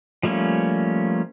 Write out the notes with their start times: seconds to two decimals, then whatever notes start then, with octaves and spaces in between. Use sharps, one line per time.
0.23 F3 G3 A3 A#3 C#4